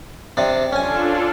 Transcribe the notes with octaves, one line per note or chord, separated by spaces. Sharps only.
C3 D4
C#4 D4 F4 A4 G#5